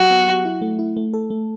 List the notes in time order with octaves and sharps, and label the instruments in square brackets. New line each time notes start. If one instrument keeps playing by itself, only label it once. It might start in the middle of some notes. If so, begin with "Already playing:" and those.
Already playing: [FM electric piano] F#3 G4 [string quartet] F#4
[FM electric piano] B3
F#3
E4
A3
E4
A3
A4
A3